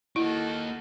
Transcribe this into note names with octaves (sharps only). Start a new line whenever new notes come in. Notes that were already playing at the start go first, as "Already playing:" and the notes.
A#3 D#4 E4 F#4 A4